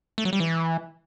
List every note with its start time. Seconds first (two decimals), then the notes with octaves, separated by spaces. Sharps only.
0.18 A3
0.25 F#3
0.33 G3
0.40 E3